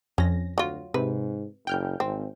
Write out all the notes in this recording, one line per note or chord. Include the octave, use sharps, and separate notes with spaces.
F2 C#4 A#6
D2 F#3 F4
G#2 C3 B4
F#1 G5 F6 G6
G#1 C4